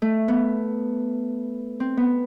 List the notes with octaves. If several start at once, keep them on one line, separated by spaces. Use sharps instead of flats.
A3
B3
C4
B3